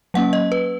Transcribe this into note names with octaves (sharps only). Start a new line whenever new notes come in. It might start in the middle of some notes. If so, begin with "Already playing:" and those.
F#3 A#3 C#4 F#5
D#5
B4